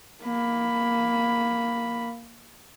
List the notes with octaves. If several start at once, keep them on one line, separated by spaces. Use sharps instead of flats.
A#3 B5